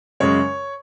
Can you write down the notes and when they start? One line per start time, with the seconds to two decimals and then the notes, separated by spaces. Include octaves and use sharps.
0.20 F#2 C#3 G#3 C#5